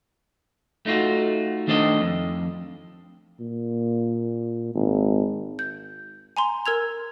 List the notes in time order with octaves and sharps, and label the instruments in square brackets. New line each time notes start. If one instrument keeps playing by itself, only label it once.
[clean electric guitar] A3 D#4 F4 F#4
D#3 A3 D4 C5 D5 D#5
F2
[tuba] A#2
G#1
[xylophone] G6
G#5 A#5 C6
A#4 E6 G#6 F7